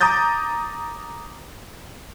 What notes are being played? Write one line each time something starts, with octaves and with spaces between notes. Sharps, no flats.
A#5 D6 D#6 G6 A6